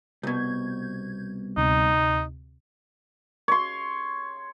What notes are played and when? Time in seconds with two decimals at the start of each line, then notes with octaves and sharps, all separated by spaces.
0.23 C2 B2 G6 G#6
1.57 D2 C3 D#4
3.48 C#5 C6